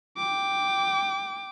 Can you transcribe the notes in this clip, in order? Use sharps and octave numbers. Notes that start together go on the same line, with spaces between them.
G5 D6